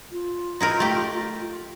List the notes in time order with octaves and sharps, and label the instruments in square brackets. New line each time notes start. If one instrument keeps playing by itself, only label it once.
[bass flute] F4
[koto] D#4 E4 A#4
A3 G4